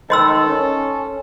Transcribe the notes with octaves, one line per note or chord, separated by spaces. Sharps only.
D#3 A4 D#5 C6 E6
C#4